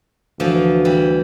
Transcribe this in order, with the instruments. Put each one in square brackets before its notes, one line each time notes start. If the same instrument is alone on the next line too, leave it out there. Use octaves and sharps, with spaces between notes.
[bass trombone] D2 [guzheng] E3 F3
[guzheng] E3 G3